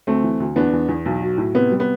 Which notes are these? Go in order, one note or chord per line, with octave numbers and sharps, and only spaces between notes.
D2 A3 C4
E3
D2
E2 B3 D4
E2
E2
B1
F#3
A2
C3 B3
G3
B3